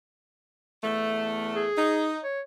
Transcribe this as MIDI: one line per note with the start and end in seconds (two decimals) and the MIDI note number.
0.84 1.70 40
0.84 1.70 57
1.56 2.09 68
1.77 2.21 63
2.24 2.41 73